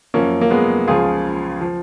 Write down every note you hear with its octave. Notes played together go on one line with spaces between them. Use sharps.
F#2 F3 A#3 C#4
A#3
G#3 B3
C#2 C#3 F3 F4 G#4
F3